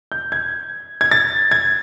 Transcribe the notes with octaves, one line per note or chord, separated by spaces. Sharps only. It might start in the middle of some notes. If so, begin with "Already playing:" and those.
G6
G#6
G#6
A6
G#6